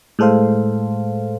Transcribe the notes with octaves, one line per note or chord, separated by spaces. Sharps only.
A2 G#3 A4 C5 F5